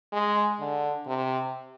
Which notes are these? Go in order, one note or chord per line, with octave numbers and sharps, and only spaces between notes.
G#3
D3
C3